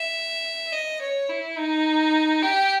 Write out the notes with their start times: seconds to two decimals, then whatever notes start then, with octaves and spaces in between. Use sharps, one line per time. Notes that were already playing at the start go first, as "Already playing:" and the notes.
Already playing: E5
0.72 D#5
1.01 C#5
1.29 E4
1.57 D#4
2.43 G4